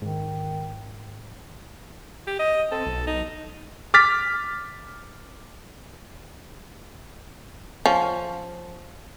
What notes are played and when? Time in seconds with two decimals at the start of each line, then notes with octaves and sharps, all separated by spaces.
0.02 G#2 D#3
2.27 G4
2.39 D#5
2.71 C4 A4
2.86 B1
3.07 D#4
3.94 D6 F6 A6 B6
7.86 F3 C#4